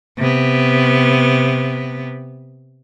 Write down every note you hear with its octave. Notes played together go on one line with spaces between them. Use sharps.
C3 B3